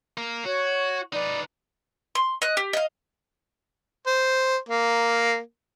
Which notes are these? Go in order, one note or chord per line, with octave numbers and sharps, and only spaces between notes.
A#3 A#4
F#4 C#5
D#4 B4 D5
C6
D#5 F#6
G4
D#5 F5
C5
A#3